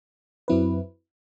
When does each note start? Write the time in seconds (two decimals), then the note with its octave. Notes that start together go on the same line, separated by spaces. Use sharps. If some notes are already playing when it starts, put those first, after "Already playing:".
0.48 F#2 F#3 C4 E4 B4